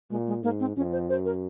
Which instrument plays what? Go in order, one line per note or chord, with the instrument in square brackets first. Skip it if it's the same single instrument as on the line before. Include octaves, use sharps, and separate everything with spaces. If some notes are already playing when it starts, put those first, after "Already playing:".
[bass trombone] A#2 [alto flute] G#3
[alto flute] G#3
[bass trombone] G#2 [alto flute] A#3
[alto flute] C4
[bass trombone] F2 [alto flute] C#4
[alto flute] C5
[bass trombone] F#2 [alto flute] C5
[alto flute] A#4